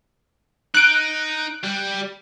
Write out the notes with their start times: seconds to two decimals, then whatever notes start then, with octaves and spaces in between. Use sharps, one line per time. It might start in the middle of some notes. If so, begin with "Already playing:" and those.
0.74 D#4 F#6 D7
1.64 G3